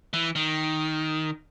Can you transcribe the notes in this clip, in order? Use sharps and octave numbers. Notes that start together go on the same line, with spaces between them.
E3
D#3